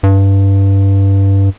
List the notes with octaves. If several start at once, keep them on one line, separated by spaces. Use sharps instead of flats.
G2